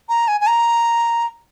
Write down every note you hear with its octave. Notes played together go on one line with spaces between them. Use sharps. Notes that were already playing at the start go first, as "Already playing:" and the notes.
A#5
G#5
G#5
A#5